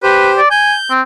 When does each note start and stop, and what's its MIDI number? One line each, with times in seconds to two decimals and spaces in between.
0.03 0.40 67
0.03 0.31 71
0.03 0.40 72
0.38 0.50 74
0.51 0.75 80
0.51 0.92 91
0.90 1.01 60